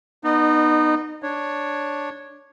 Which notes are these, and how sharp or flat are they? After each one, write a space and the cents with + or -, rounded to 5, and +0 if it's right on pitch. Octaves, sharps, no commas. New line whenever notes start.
B3 -15 D#4 -20 D#5 -40
D4 +0 C#5 -5